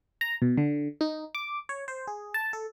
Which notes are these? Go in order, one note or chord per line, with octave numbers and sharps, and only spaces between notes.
A#5
B2
D3
D#4
D6
C#5
C5
G#4
A5
A4